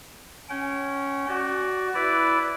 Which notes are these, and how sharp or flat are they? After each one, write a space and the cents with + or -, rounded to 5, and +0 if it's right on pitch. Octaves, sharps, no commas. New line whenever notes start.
C#4 +0 G5 -35
F#4 +15 D5 +0
E4 +0 B4 +0 D5 -15